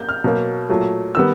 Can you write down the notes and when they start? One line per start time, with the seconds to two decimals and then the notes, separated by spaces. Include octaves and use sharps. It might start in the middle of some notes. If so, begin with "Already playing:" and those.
Already playing: A#3 G6
0.09 F6
0.24 B2 F#3 A#3
0.69 A#2 F#3 A3
1.15 D#3 G3 B3 E6